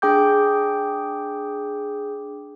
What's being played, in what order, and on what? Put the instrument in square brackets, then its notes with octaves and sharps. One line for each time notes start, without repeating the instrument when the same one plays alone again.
[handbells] D4 G#4 G5 D6 G6